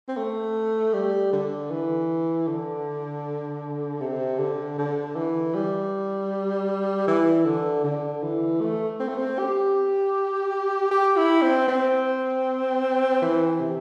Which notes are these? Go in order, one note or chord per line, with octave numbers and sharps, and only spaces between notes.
C4
A3
G3
D3
E3
D3
C3
D3
D3
E3
G3
E3
D3
D3
E3
A3
C4
A3
C4
G4
G4
E4
C4
C4
E3
C3